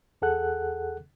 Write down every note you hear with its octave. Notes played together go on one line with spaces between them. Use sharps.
E2 G#4 A4 F#5 F#6